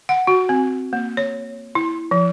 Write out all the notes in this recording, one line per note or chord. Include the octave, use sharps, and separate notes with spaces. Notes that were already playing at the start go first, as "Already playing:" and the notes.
F#5
F#4
C4
A#3
C#5
E4
F3